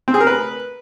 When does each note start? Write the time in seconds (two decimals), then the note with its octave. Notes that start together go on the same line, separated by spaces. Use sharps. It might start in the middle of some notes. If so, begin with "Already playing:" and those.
0.08 C4
0.14 G#4
0.20 A#4
0.27 B4